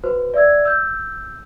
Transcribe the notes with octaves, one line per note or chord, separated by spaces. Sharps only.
F#4 B4 C5
D5 E5 E6 G#6
E6 G6